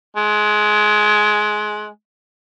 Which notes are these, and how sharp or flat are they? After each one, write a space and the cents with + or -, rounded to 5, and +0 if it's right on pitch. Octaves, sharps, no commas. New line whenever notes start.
G#3 +20